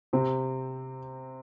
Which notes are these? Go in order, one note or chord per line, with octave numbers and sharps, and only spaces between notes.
C3 C4